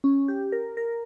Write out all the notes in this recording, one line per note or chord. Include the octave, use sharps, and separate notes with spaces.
C#4
G4
A#4
A#4